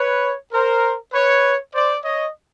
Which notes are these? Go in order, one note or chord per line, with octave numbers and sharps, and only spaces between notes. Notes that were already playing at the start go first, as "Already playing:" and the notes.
Already playing: B4 C#5
A#4 C5
B4 C#5
C5 D5
C#5 D#5